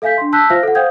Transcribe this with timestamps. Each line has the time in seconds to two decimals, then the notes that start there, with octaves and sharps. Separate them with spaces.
0.02 A4 E5 F5 G#5 G6 B6
0.18 D4 C6
0.33 A5 E6 F#6 G6 B6
0.50 F4 C5 E5 F5 F6 A#6
0.63 A4 F#5
0.75 C5 F5 G5 D#6 G6 G#6